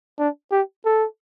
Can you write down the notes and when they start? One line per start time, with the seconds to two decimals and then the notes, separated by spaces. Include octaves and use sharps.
0.19 D4
0.52 G4
0.85 A4